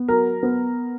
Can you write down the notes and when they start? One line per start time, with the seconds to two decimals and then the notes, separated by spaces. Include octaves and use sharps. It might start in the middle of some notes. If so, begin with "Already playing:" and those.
Already playing: B3
0.08 F#3 A#4
0.43 B3